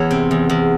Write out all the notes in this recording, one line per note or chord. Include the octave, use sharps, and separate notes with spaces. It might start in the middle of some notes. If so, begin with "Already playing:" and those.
Already playing: E2 E3 C#5
C3
E2
E2